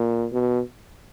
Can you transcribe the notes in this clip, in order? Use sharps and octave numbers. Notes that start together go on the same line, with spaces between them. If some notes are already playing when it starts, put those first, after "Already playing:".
Already playing: A#2
B2